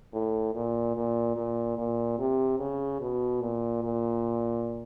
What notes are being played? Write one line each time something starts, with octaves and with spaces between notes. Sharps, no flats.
A2
A#2
A#2
A#2
A#2
C3
C#3
B2
A#2
A#2